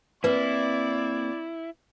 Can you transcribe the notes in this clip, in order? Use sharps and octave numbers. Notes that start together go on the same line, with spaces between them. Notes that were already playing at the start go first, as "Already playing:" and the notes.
A#3 C4 E4 B4 D5